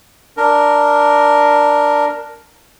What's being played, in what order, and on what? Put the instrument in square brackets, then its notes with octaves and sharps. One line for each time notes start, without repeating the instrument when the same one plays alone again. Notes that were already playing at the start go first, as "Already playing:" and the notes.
[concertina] D4 A#4